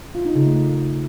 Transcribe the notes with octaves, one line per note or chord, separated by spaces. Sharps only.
F4
D#4
C#3
A3